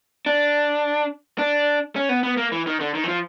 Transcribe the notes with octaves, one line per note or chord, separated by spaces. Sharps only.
D4
D4
C#4
B3
B3
A#3
E3
D#3
D3
D#3
E3
F3